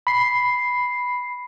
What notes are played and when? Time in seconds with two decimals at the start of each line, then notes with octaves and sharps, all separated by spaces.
0.07 B5 C7